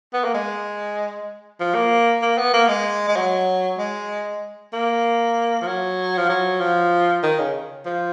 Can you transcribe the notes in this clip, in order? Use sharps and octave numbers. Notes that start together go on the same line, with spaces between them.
B3
A#3
G#3
F3
A#3
A#3
B3
A#3
G#3
G#3
F#3
G#3
A#3
F3
F#3
F3
F#3
F3
D#3
C#3
F3